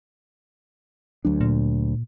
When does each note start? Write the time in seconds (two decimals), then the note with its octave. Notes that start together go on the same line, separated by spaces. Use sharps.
1.25 D2 F#3 D4
1.41 A#2